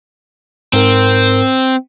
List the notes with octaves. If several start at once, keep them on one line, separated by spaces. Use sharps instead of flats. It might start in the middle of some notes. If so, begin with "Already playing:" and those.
G#2 C4 A#4